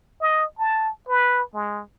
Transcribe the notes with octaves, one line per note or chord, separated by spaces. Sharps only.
D#5
A5
B4
G#3